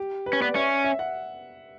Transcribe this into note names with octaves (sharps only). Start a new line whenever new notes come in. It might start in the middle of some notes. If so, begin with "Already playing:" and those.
Already playing: G4
B4
C#4
B3 D5
C#4 E5
E5
F#5